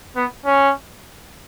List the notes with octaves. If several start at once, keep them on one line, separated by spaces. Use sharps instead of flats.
B3
C#4